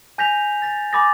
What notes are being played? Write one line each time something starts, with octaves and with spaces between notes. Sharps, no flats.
G#5 G6 A#6 B6 F7
A6 A#6
G#5 B5 D6 D#6 A6 A#6